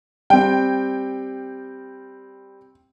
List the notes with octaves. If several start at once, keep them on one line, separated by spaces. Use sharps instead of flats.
G3 C4 G5